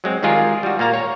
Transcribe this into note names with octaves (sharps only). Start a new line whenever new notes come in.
F#3 G#3 C4
D#3 G3 G#3 F4 G#4 A#4
G3 F#4
A#2 A#3 F5 A#5
C#5